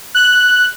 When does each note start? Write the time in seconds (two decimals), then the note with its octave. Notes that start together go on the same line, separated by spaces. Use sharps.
0.15 F#6